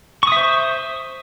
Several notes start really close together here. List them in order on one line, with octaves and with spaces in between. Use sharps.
C#6 D#6 E5 C5